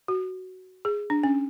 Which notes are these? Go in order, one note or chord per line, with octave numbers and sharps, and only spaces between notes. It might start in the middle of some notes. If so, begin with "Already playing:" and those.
F#4
G#4
D4
C#4